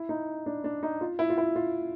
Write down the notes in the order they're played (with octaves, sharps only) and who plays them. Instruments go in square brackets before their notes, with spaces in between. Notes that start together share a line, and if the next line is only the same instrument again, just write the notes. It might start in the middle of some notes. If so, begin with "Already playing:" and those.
Already playing: [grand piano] E4
D#4
D4
D4
D#4
F4
E4
F4
E4
F4